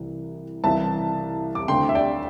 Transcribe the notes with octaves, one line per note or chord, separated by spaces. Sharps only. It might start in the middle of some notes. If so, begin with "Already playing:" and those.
Already playing: C2 C3 E3
C2 C3 E3 E5 A5
D6
D2 D3 G5 C6
E5
D5 G5